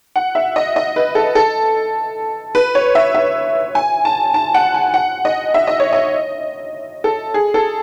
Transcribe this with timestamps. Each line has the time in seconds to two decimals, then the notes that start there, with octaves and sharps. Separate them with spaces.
0.16 F#5
0.35 E5
0.56 D#5
0.76 D#5
0.96 B4
1.15 A4
1.35 A4
2.55 B4
2.75 C#5
2.95 E5
3.15 E5
3.75 G#5
4.05 A5
4.34 A5
4.54 F#5
4.74 G#5
4.94 F#5
5.25 D#5
5.54 E5
5.67 D#5
5.80 C#5
5.92 D#5
7.04 A4
7.34 G#4
7.54 A4